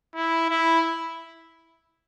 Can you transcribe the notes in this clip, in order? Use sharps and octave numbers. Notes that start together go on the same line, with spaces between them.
E4
E4